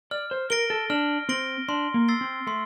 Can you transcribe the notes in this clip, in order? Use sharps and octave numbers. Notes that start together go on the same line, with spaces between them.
D5 F6
C5
A#4 A#6 D7 G7
A4
D4 F6
C4 A#6 D7 G7
D4 C6
A#3
E6 A6 C7 G7
C4
A3 C6